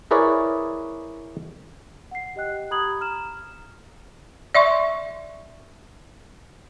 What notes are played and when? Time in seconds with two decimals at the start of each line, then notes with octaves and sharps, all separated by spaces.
0.11 E4 G#4 A#4 B4 C#5 D5
2.11 F#5 C7
2.36 G4 D#5 G5 F#6
2.71 G4 A#5 B5 D#6 G#6 F#7
3.00 A#5 F6 E7
4.55 D5 E5 C6 C#6